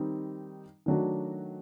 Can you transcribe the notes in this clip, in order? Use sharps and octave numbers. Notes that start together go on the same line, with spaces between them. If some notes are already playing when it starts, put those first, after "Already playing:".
Already playing: D#3 G3 C4 D#4
D#3 F#3 A3 D4 F#4